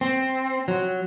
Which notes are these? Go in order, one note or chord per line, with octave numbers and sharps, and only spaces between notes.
C4
F#3